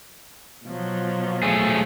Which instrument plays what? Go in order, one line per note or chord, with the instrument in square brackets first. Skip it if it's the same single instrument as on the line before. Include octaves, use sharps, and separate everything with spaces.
[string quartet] B2 F3 F#3
[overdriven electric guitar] A3 G#4